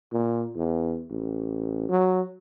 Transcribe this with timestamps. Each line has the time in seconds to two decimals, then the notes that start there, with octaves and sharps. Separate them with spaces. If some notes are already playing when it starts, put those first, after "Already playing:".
0.13 A#2
0.56 E2
1.10 A1
1.89 F#3